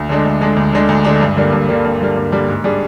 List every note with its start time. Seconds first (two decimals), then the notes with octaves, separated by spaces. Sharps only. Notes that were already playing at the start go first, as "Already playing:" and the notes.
Already playing: D2
0.09 D3 G#3 D4
0.25 D2
0.41 D3 G#3 D4
0.56 D2
0.73 D3 G#3 D4
0.89 D2
1.04 D3 G#3 D4
1.21 G2
1.37 D3 G3 A#3
1.52 G2
1.69 D3 G3 A#3
1.85 G2
2.00 D3 G3 A#3
2.16 G2
2.32 D3 G3 A#3
2.48 G#2
2.64 G3 D4 G#4